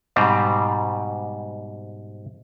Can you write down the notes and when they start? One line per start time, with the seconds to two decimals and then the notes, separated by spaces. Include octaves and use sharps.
0.16 G#2 B2 G3 C4